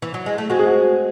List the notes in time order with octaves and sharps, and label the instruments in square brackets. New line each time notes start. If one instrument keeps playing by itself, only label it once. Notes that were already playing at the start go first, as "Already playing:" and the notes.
[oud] E3
F#3
G#3
A3
[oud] G#3 C4 [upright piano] F#4
[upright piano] G#4
F#4